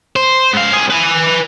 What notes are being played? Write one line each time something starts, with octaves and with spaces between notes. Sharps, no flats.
C5
G#2 F5
C2 G#4
B4 G#5